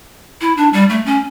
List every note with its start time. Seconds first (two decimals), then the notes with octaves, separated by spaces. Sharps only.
0.41 E4
0.57 D4
0.73 G3
0.89 A3
1.06 C#4